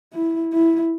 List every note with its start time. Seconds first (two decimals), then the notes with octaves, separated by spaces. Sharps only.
0.13 E4
0.53 E4